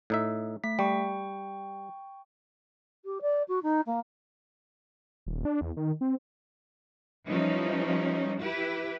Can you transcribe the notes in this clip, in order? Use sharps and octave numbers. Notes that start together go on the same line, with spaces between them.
A2 D#4 E5
A3 B6
G3 G5 C#6
G4
D5
F#4
D#4
A#3
D#1
D4
E2
D#3
C4
E3 F3 G3 C#4 D#4
E4 G4 B4